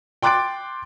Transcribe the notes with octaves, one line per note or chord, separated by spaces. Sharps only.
G5 C6 D6 F#6 A6 D7